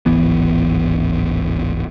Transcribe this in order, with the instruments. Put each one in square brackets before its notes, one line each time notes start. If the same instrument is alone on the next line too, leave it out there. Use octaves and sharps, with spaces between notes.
[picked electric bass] D1 G#1 E3 B3